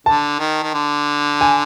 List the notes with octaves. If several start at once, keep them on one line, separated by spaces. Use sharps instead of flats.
D3 A5
D#3
D#3
D3
G#5